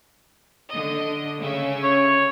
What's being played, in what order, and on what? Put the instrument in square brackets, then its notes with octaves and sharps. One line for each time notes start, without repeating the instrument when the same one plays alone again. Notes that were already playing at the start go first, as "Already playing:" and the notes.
[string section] D3 D#5
C#3 C#4 E5
[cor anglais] C#5